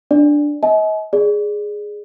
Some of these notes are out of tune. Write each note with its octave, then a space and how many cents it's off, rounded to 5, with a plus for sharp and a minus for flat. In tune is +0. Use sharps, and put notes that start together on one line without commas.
D4 +0 D5 +0
D#5 +40 G#5 +45
G#4 +0 D5 +0